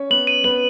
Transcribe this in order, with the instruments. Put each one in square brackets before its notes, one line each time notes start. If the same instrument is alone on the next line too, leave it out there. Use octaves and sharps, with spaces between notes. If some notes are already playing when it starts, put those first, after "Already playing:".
Already playing: [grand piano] C#4 C#5
[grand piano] B3 B4 [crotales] F#7
[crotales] D#7
[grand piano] B3 B4 [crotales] F#7